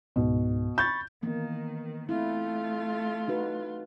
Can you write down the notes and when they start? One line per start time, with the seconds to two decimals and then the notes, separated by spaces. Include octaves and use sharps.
0.16 C#2 G#2 B2
0.78 B5 C#6 G6 A6
1.23 D#3 E3 A#3 B3
2.09 A3 A#3 C4 E4 F4
3.28 D#4 F#4 B4